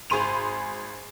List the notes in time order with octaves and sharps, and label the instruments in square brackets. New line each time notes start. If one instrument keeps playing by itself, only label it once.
[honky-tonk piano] G#1 G#4 B5 C6 D#7 F7